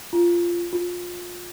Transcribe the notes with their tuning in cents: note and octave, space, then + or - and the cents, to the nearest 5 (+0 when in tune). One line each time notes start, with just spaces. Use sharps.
F4 -10
F4 +20